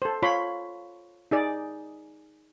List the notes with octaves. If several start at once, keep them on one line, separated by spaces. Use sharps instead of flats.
A4 C5
F4 C#5 B5 C6
D#4 G#4 D5